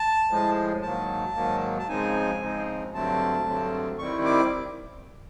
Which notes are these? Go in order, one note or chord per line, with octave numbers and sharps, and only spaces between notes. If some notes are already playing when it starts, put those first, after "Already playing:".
Already playing: A5
A2 F3 G#3
G#2 D#3 F#3 A#3 A5
G#2 D#3 F#3 A#3
A5
C#3 F3 G#3 C4 D#4 G#5
C#3 F3 G#3 C4 D#4
G2 D3 F#3 A3 C4 A5
G2 D3 F#3 A3 C4
D#3 G3 C4 E4 C#6
D6